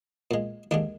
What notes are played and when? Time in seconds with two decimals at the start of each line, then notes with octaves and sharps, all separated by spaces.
0.31 A#2 G#3
0.71 D#2 D3 G#3 D4